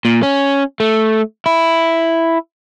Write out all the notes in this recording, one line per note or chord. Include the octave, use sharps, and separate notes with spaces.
A#2
C#4
A3
E4